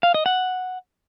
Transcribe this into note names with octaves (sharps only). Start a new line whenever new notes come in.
F5
D#5
F#5